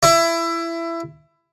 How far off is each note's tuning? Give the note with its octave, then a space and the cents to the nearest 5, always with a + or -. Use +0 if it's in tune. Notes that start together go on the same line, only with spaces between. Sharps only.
E4 +20